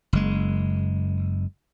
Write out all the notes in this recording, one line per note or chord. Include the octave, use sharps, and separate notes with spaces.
F#1 G#3